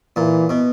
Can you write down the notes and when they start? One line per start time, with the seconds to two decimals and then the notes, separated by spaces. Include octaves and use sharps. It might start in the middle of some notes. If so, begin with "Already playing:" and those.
0.16 A#2 E3
0.49 B2